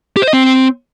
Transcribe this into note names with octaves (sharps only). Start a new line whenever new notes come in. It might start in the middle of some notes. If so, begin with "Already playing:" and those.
G4
C5
D#5
C4